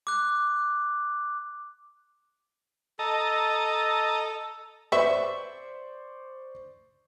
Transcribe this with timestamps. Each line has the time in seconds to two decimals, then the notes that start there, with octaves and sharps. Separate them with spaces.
0.07 D6 F#6
2.99 A4 D#5 A5 A#5
4.92 B4 C5 D5 E5 C#6